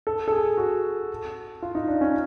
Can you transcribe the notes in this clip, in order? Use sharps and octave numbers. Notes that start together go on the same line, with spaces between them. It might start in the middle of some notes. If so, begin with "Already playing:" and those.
A4
A4
G#4
F#4
F4
D#4
D4
C#4